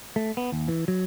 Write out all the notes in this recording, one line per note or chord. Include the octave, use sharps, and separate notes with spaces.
A3
B3
D#2
E3
F#3